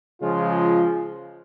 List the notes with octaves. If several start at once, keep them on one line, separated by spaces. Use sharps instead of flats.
C#3 F3 G#3 F4